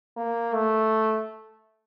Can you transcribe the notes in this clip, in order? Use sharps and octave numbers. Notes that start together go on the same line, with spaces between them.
A#3
A3